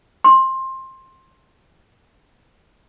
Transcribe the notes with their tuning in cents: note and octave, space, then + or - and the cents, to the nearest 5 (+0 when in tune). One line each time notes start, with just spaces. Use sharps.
C6 +20